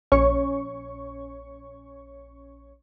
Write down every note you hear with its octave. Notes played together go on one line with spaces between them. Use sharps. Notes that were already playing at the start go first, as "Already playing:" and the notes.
A#1 C#4 C#5 C#6